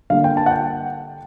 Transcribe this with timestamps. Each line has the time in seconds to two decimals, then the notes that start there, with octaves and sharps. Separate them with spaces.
0.10 D3 G3 A#3 F5
0.24 G5
0.37 A5
0.46 F#5
0.51 G5